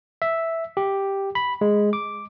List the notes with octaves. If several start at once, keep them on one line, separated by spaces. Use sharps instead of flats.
E5
G4
B5
G#3
D6